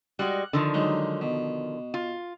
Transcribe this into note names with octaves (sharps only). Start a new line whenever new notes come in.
G3 G#3 F#4 F#5
D3 D#3 F3
F#3 G#3 D#4
B2
F4